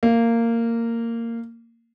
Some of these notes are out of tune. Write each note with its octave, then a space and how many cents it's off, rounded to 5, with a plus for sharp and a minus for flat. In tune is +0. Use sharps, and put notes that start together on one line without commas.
A#3 -15